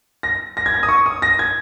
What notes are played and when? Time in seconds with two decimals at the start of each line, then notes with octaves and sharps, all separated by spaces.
0.23 A#6
0.57 A#6
0.66 G#6
0.74 A#6
0.83 D#6
0.89 C#6
1.06 D#6
1.22 A#6
1.39 G#6